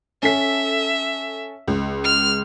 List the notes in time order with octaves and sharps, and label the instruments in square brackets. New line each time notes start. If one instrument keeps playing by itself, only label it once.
[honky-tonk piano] C#4 A4 B6 [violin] E5
[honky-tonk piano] C#2
[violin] F6